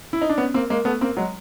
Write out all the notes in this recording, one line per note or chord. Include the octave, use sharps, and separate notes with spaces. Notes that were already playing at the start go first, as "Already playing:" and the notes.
E4
D#4
D4
B3 C#4
A#3 C4
G#3 A#3
A3 B3
A#3 C4
F#3 G#3